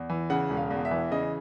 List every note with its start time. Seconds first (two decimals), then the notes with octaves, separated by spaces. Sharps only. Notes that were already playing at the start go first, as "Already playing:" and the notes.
Already playing: E2
0.10 E3
0.30 C#3 F#5
0.50 E1
0.57 F5
0.71 E2
0.85 E5
0.91 E3
1.11 C#3 D#5